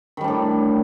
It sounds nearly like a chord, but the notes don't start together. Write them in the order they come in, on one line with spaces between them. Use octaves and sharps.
D#3 G3 D4 A2